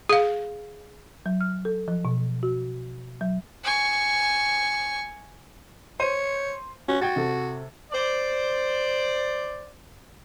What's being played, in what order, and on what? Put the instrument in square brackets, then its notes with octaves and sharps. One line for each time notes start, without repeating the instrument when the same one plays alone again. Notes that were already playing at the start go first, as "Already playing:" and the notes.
[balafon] G#4 F5
[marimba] F#3
F6
A4
F3
B2
F#4
F#3
[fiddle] G#5 C#6
[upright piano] C5 D#7 [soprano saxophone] C#5
[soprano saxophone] C#4 [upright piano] F#4
[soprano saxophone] F#4 [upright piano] G5 G#6 A6
[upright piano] C3 A4
[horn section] C5 D5